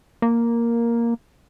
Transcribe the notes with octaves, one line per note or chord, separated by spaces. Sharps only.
A#3